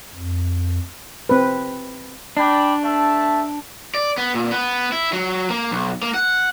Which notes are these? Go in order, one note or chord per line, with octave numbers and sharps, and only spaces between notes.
F2
C4 B4
D4 D5 G5 B5
A3 E5 A5
D5
B3
A#2
B3
E4
F#3
A#3
B1
A#3
F#5